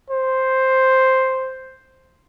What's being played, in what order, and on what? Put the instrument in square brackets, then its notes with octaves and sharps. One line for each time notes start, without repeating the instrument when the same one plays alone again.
[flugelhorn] C5